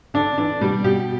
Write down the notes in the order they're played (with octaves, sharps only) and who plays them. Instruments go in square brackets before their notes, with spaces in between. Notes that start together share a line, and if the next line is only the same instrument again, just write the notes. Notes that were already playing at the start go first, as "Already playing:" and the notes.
[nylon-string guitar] D3 [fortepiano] D4
[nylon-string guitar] E3 [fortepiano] D4
[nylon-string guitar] B2 [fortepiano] G3
[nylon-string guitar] B2 [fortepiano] G4